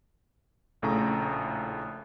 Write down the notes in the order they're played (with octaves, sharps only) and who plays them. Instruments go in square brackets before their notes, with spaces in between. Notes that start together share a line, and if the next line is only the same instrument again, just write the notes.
[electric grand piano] A#1 A2 C#3 A3 A#5